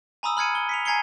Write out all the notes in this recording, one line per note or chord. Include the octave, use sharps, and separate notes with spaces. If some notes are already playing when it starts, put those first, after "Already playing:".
G#5 A#5 B5 D#6 E6
B5 F6 G#6 C#7 D#7
G7
B6 C#7 F7
G#5 A#5 G#6 C7 C#7 G7